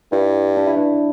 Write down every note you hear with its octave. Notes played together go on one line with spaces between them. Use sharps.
G2 E4
D4
E4
D4